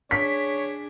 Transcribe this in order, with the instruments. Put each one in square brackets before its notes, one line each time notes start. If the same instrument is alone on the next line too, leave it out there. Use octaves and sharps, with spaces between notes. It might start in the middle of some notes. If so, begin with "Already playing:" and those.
[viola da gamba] D4 G#4 [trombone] C#5 [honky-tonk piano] B6